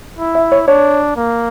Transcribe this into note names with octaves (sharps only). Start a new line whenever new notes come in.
E4
E5
C#5
D4 C#5
A#3